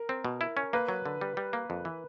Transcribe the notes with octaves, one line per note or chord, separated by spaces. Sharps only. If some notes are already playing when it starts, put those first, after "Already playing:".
Already playing: A#4
C4
B2
E4
C#4
A#3 B4
F#3
D3
G3
G3
A#3
F2
E3